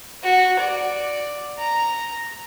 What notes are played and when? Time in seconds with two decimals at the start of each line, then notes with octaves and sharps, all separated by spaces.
0.23 F#4
0.60 D5
1.58 A#5